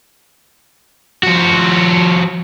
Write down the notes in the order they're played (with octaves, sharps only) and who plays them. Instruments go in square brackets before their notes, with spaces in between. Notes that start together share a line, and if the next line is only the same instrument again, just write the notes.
[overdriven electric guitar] F3 F#4